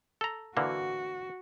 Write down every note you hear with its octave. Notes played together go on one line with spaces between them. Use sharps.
A4 A#5
D3 E3 A#3 F#4